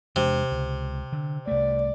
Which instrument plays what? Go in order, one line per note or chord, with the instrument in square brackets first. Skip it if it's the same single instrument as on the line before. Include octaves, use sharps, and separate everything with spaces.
[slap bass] E2 G#3 D4 [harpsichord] C3
[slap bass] C#2
D3
[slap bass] C2 A3 [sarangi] D5